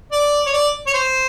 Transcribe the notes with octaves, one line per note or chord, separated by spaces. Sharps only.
D5
C#5
D5
C#5
C5